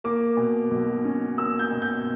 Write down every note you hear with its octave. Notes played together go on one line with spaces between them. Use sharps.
A#3 D6
B2
B1
C#4
A#3 E6
G6
B2
G6